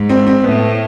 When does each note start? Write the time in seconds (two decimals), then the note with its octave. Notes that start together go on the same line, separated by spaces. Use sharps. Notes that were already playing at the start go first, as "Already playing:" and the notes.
Already playing: G#2
0.09 C4
0.27 C4
0.44 A2 B3